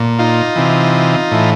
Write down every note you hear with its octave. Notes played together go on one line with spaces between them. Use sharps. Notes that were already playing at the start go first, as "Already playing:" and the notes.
Already playing: A#2
D#4 F4
C3 E3
A2 E3